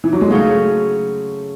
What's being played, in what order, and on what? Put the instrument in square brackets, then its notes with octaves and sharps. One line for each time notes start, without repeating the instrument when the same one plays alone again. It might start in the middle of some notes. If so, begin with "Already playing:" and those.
[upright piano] E3
F#3
G#3
[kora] C#3 F#3 C#4 [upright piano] A3